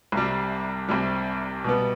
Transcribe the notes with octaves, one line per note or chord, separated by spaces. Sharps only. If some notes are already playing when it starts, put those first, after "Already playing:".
C2 C3 G3
C2 C3 G3
B2 G3 B3